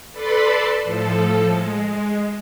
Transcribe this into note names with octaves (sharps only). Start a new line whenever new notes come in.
A4 B4 D5 A5 B5 C6
A2 F3 A4
G#3